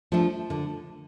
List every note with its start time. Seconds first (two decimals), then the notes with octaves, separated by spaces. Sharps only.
0.12 F3 A3 D4 A4
0.50 D3